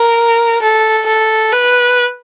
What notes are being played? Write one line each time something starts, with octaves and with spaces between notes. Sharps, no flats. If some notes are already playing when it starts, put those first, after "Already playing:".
Already playing: A#4
A4
A4
B4